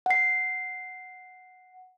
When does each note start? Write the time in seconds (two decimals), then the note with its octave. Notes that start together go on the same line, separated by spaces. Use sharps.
0.06 F#5 C7